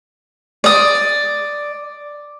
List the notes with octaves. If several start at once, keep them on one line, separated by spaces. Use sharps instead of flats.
D5 D#6